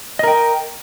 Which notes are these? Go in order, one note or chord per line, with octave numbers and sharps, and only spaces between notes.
A#4 D#5 G5